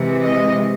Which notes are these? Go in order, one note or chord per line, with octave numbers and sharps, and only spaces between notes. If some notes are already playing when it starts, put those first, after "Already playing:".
Already playing: C3 E3 G#3
D#5